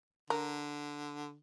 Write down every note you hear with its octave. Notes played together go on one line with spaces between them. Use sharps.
D3 A#4